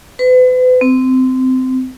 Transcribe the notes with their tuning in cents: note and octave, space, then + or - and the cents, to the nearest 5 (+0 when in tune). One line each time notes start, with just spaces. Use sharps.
B4 +40
C4 -20